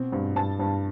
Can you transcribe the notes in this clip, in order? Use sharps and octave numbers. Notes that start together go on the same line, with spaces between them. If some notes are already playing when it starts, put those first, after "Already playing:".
Already playing: B2 C4
G2
G2 A5
G2